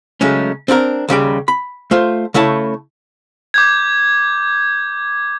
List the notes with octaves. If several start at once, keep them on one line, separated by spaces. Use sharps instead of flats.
C#3 F#3 G#3 A3 C#4
C4 D4 E4 A#4
D#2 C#3 G3 G5
B5
A3 F4 C5
C#3 A3 E4 C#5 A5
D6 G6 G#6